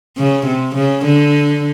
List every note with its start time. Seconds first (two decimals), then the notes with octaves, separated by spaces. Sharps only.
0.17 C#3
0.46 C3
0.75 C#3
1.05 D3